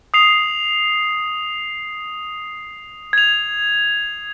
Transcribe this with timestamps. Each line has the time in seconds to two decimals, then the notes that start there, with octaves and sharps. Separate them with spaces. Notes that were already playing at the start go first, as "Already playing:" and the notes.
0.14 D#6 C7 F7
3.13 G#6 F7